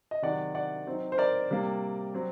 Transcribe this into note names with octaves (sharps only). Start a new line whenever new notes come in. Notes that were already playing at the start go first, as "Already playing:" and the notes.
D#5
C3 D#3 F#3 D5 F#5
D5 F#5
F#3 C4 D#4
C5
A#4 D5
C3 G3 A#3
F#3 C4